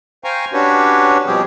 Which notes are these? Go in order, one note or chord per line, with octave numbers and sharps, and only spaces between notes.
C5 F5 G5 G#5 A#5 C#6
C#4 D4 F#4 G4 B4 C#5
B2 F3 G3 C4 G4 G#4